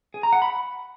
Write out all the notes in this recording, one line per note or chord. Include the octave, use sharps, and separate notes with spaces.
G#4
A#5
F#5
B5